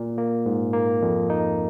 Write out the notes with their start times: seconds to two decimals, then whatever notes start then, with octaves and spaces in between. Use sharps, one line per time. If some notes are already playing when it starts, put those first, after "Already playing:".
Already playing: A#2
0.18 A#3
0.46 G#2
0.73 A#3
1.02 F2
1.30 D#4